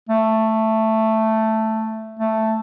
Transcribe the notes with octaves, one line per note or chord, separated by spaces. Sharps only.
A3
A3